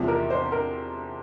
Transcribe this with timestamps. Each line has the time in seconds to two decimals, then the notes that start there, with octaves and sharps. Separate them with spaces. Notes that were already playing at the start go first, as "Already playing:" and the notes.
Already playing: E2 C3 F3
0.08 A#4
0.30 C5
0.52 A#4